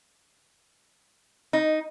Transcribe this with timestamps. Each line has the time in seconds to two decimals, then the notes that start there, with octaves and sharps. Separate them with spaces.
1.53 D#4